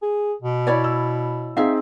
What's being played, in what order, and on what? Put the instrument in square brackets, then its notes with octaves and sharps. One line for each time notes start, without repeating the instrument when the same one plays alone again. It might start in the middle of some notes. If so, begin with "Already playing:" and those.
[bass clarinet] G#4
B2
[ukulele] E4 C#5 D5
[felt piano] E6
[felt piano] C4 D#4 G#4 [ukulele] E5 F5